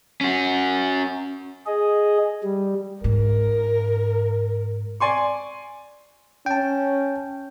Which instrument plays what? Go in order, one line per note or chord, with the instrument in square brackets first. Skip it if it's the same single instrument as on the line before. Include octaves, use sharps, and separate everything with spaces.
[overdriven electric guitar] C#4 F#4
[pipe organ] G#4 D#5
G3
[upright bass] G#2 [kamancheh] A#4
[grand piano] D5 G#5 C6 C#6
[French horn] C#4 [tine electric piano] G5 A5